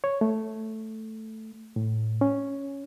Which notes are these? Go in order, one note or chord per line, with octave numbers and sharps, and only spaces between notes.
C#5
A3
A2
C#4